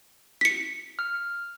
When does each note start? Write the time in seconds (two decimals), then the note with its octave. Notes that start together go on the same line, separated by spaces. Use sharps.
0.41 B6 C#7
0.99 F6